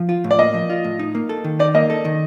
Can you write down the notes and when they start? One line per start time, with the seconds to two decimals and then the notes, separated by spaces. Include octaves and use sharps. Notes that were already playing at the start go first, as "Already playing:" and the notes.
Already playing: F3
0.09 F4
0.24 A2
0.31 D5
0.39 A#3 D#5
0.54 F3
0.70 F4
0.84 A2
0.99 D#4
1.15 A#3
1.29 A4
1.44 D#3
1.59 D#4 D5
1.75 A#3 D#5
1.90 A4
2.05 D#3